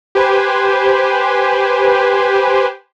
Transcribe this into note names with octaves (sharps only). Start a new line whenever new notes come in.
G4 B4 C5 G#5